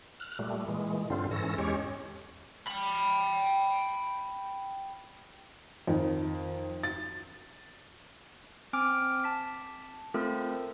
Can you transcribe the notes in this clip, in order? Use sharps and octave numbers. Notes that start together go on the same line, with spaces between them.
F6 F#6
A#2 G3 A3
A#2 E3 G#3
G2 D3 C4 F4
G#2 E3 C#4 A4 A#6
E2 G#3 C#4 G4 C#5
G5 B5
F2 D#3
A6
C4 G#5 D6 F6 D7
A5 B6
A3 C4 F4 A4 A#4